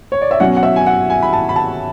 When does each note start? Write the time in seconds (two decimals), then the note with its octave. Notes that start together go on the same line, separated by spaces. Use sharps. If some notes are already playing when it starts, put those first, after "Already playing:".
0.12 C#5
0.22 D5
0.31 E5
0.40 B2 F#3 C#4 F#5
0.56 F#5
0.63 E5
0.76 G#5
0.86 F#5
1.10 G#5
1.22 B5
1.33 A5
1.49 B5
1.56 A5